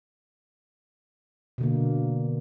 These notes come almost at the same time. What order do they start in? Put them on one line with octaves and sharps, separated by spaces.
B2 D3 A#3